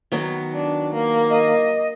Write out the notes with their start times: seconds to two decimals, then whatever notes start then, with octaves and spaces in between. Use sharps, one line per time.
0.12 D#3 F#3 B3
0.54 D4
0.94 A#3
1.30 D#5